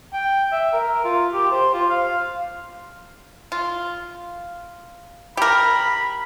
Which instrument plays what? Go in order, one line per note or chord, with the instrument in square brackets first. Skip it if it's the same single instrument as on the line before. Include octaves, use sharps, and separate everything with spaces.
[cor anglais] G5
E5
A#4
F4
G4
C5
F4
F5
[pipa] F4
[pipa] G4 A#4 [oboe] B5